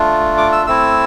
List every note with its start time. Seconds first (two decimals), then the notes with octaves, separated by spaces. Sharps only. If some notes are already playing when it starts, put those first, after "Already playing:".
Already playing: A3 D4 F4
0.37 D6
0.52 E6
0.67 A3 C4 E4 E6